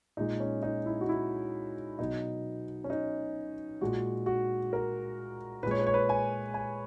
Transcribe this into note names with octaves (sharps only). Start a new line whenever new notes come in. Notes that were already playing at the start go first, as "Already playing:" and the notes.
A#2 G#3 D#4
C#4
D#4
E4
F#4
E4
B2 F#3 D#4
C#4
D#4
A#2 G#3 F#4
F#4
A#4
A#2 G#3 B4 C#5
B4
C#5
B4
G#5
G#5